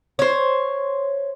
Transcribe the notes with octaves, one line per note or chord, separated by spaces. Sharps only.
C5 C#5